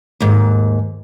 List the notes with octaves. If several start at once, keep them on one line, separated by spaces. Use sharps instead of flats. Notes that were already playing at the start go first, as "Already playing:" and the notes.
D#2 G#2